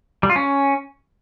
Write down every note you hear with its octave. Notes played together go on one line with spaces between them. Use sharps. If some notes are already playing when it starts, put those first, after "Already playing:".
G3
F4
C#4